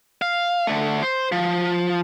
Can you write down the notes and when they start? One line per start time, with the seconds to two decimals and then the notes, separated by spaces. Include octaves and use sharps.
0.22 F5
0.67 D3 A3
1.03 C5
1.32 F3